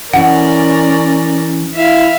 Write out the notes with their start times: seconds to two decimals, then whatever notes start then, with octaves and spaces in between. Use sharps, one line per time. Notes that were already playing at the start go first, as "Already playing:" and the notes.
0.13 E3 C#4 A#4 D5 F#5
1.74 E4 E5 F5